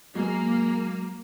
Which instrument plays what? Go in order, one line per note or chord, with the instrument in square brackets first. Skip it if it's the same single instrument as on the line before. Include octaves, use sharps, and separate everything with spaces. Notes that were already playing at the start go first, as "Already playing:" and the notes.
[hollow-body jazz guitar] F#3 [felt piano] G#3 [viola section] A#3